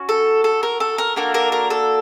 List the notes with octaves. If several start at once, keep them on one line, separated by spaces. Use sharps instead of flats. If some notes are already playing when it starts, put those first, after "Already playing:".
Already playing: C#4 F#4
A4
A4
A#4
A4
A#4
A#3 D4 F#4 A4 A#4
A#4
A#4
A4